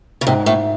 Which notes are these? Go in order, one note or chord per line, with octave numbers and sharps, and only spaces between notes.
C#3
G#2 C3
A2